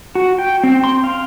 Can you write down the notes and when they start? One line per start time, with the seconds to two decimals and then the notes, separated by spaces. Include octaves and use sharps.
0.15 F#4
0.38 G5
0.64 C4
0.84 C6
1.04 F5